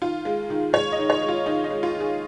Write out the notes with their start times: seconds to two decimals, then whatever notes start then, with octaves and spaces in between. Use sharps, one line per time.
0.01 D#3 F4
0.25 G#3
0.50 D#3
0.73 G#3 C#5
0.92 D#5
0.98 D#3
1.10 C#5
1.22 G#3
1.28 F4
1.46 D#3 D#4
1.64 D#4
1.70 G#3
1.83 F4
1.94 D#3
2.00 G#4